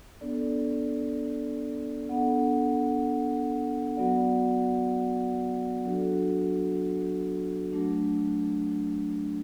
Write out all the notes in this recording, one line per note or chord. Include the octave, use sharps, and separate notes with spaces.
B3 D4 A4 D5
B3 D4 A4 F#5
F#3 B3 F#4 D5 F#5
F#3 D4 F#4 A4
F#3 A3 D4